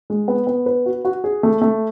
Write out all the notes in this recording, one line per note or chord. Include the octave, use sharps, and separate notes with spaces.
G#3
B3
B3
B4
F#4
F#4
G#4
A3
A3